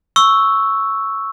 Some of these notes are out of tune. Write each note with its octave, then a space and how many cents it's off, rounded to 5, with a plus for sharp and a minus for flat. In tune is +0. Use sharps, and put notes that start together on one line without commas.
C#6 +0 E6 +0